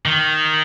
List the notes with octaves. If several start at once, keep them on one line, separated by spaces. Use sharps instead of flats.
D#3